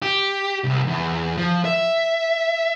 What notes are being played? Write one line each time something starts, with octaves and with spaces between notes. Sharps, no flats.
G4
C2
E2
F3
E5